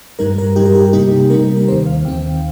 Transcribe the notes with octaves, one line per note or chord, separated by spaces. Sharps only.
G2 G3 D#4 A#4
A#4
G2 G3 D#4 G4
A#4
G4
C3 G3 A#3 D#4 G4
C3 G3 A#3 D#4 A#4
A#4
D#2 D#3 C4 C5
F5
D#2 D#3 C4 G5